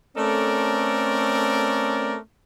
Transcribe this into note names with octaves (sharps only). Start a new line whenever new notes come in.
A3 C4 C#4 A4 A#4 D5